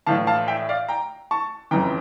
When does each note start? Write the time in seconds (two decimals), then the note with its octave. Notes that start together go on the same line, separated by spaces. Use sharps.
0.06 A#1 A2 E3 F5 A5
0.27 F5 A5
0.48 E5 G5
0.59 E5
0.69 D5 F5
0.88 G5 A#5
1.31 A5 C#6
1.71 G1 F2 C#3 E3 G5 A#5